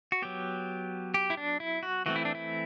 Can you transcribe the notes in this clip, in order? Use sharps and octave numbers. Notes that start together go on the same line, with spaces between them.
F#4
F#3 B3 G4
G4
E4
D4
E4
F#4
E3 A3 C4 F#4
E4
D4
E4